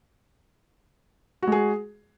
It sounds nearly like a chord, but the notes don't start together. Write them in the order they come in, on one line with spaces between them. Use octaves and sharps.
F#4 G#3 G#4